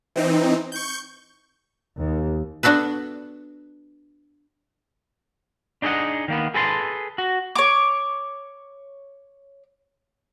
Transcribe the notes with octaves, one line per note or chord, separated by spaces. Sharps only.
E3 C4 D#4
C#6 G6
D#2
B3 D4 F#4 A4 B4
D4 D#4 G#4 C#5 D#5 F#5
D#3 A#3 B3
G#4 A4 B4 G#5 A5 C6
F#4
C#5 D6